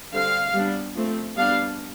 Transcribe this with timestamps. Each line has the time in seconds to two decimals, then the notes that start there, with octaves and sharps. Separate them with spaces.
0.13 D3 G3 C4 F5
0.54 G3 B3 D4
0.95 F3 A3 C4
1.37 G3 B3 D4 F5